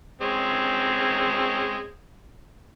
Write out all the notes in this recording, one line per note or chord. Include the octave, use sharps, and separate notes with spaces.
G#3 C4 C#4